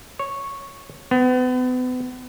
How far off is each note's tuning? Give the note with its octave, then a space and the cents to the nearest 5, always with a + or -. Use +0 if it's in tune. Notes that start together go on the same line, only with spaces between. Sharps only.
C#5 -5
B3 +35